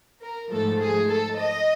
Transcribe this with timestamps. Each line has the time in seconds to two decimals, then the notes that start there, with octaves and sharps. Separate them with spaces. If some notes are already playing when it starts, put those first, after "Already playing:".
0.22 A#4
0.50 G#2 F3 A3 A4
0.79 G#4
1.06 A4
1.35 D#5